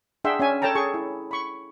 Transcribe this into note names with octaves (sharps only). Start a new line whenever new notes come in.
D4 G#4 E5 F#5 G5 C6
C#4 E5 G#5
A4 C#5 G5 A5 A#5
G#4 C#6
E4
B5 C#6